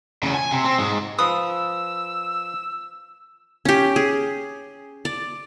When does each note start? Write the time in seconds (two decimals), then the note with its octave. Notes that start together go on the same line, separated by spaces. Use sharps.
0.23 E2 C#3
0.35 G#5
0.51 C3
0.64 C4
0.78 G#2 G#3
1.19 F3 B4 D#6 E6
3.65 C#4 G4
3.96 G#4
5.05 D5